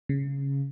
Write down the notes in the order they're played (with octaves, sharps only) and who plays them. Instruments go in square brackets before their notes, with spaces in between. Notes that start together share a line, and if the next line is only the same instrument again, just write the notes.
[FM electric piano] C#3